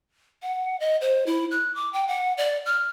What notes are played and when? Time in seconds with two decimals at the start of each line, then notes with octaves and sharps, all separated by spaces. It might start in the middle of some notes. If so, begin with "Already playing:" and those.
0.42 F#5
0.80 D#5
1.01 C5
1.26 E4
1.51 F#6
1.75 D6
1.93 G5
2.08 F#5
2.37 D5
2.66 F6